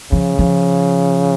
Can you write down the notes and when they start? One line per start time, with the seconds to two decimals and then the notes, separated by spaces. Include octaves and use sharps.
0.12 C#3 F3
0.39 F3